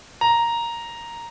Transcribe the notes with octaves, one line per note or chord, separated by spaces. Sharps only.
A#5